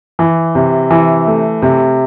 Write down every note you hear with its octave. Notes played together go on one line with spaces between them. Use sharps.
E3
C3
E3
A3
C3